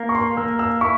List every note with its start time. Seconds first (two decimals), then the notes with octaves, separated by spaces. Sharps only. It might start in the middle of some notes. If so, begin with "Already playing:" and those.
Already playing: A#3
0.09 C#6
0.15 C6
0.37 A#3 E6
0.59 E6
0.81 E4 C#6